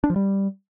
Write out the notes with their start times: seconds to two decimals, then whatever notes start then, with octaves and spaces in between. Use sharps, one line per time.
0.04 D4
0.10 F3
0.16 G3